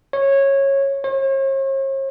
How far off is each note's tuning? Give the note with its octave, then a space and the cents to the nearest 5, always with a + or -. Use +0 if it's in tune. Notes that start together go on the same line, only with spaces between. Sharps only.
C#5 -15
C#5 -45